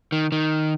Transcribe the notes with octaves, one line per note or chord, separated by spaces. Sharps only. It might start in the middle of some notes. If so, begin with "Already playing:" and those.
D#3
D#3